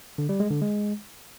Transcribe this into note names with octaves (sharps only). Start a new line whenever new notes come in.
D3
G3
G#3
D3
G#3